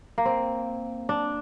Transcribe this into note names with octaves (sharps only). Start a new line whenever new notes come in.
A#3
C4
D4